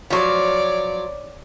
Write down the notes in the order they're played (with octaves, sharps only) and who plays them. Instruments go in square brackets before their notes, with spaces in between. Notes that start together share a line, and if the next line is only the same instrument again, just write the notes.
[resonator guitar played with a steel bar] F3 F#3 [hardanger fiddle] C#5 D5